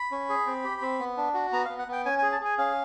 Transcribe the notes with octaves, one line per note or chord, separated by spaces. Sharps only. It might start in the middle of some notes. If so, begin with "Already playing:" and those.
Already playing: B5
C#4
G#4
C4
G4
C4
B3
D4
F#4
B3 A#5
F5
B3
F#5
B3 G5
C#4 G#5
G#4 G#5
A5
G#4 G#5
C#4 F5